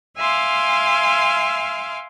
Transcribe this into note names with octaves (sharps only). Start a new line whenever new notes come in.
E5 F5 G#5 C6 D6 F6